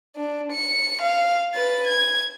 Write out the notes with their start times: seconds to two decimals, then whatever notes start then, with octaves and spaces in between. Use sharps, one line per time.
0.16 D4
0.52 C#7
1.02 F5
1.54 B4 A6
1.87 G#6